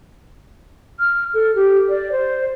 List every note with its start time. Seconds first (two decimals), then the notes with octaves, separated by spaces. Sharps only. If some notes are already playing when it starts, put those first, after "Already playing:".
0.99 F6
1.34 A4
1.55 G4
1.89 D5
2.12 C5